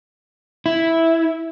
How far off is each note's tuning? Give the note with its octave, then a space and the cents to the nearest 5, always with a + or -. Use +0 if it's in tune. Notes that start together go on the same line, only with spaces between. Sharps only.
E4 -5